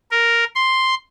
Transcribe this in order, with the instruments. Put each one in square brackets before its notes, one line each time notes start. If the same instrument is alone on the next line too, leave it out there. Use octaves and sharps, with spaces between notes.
[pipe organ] A#4
C6